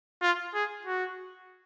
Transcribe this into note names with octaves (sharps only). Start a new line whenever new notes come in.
F4
G#4
F#4